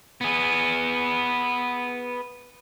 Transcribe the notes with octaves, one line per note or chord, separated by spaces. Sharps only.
B3 G#4